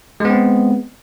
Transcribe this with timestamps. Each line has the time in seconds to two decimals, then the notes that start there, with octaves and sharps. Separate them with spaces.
0.20 G#3
0.25 B3
0.30 C4